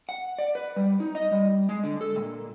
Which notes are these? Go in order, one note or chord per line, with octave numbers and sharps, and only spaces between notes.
F#5
D5
B4
G3
D#4
D#5
G3
G#3
D3
A4
A#2